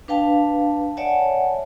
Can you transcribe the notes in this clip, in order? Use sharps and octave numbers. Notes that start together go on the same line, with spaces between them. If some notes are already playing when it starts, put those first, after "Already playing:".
D4 B4 F5 G5 A5
C#5 D5 E5 F#5 G#5 A5